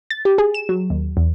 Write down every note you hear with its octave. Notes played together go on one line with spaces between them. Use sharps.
A6
G4
G#4
E7
F#3
D#2
E2